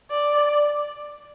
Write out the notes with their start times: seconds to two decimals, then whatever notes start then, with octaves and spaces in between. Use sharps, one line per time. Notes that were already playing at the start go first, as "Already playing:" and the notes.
0.11 D5